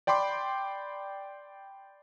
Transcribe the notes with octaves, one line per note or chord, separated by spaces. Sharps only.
D5 G5 B5 C6 D6